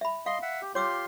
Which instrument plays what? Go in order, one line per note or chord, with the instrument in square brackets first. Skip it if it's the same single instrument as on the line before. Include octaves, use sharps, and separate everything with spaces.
[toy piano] E5 B5
[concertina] D#5 C6 [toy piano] F5
[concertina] E5 F#5
G4
[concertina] F4 G4 C6 [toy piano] C#5 D6 E6